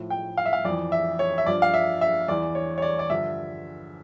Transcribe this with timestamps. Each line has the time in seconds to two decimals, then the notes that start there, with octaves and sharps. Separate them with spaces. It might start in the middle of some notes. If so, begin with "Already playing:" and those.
Already playing: A2 F3
0.10 G5
0.37 F5
0.46 E5
0.53 F5
0.65 F2 D5
0.68 E3
0.92 E5
1.19 C#5
1.38 E5
1.46 G2 F3 D5
1.62 F5
1.74 E5
2.01 E5
2.28 E2 E3 D5
2.55 C#5
2.78 C#5
2.82 D5
2.99 D5
3.10 G2 D3 F3 E5